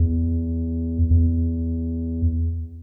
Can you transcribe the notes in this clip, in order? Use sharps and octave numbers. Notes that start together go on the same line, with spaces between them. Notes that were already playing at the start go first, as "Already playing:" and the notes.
Already playing: E2
E2